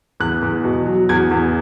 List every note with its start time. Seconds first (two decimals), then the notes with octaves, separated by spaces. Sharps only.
0.20 E2 F#6
0.42 E2
0.64 B2
0.86 F#3
1.09 E2 G#6
1.31 E2